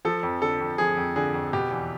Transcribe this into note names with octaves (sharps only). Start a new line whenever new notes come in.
F3 A4
F2
D3 A4
F2
F3 G#4
F2
D3 G#4
F2
B2 G4
E2